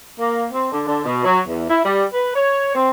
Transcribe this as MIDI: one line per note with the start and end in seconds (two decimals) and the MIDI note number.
0.19 0.45 58
0.52 0.68 60
0.72 0.84 50
0.87 1.02 50
1.05 1.22 47
1.25 1.40 54
1.47 1.65 40
1.69 1.81 64
1.85 2.04 55
2.13 2.33 71
2.35 2.72 73
2.74 2.90 60